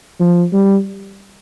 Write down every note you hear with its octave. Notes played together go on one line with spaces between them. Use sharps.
F3
G3